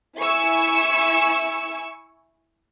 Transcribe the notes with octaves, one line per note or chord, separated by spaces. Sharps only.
E4 G#5 C#6 E6